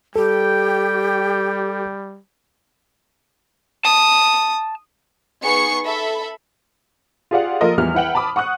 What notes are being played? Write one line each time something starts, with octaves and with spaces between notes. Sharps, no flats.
G3 G4 A4 G5
A5 D#6
B3 D#4 G#4 C#6 C7 C#7
A4 E5 B5
F4 G4 G#4 D5 F5 F#5
F3 A#3 F4 A4 A#4 D#5
E2 E3 F3 G3 B3 F6
E4 B4 F#5 G5 F#7
A5 B5 D6 D#6
F#5 C#6 D#6 F#6